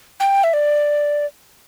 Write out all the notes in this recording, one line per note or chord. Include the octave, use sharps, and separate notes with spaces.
G5
E5
D5